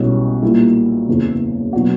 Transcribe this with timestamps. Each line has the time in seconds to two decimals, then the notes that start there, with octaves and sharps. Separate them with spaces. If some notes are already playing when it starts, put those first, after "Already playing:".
Already playing: B1 B2 G3 C#4 E4
0.42 A#2 G3 A#3 E4
1.08 F#1 E2 C#3
1.73 B2 F#3 B3 D4 F#4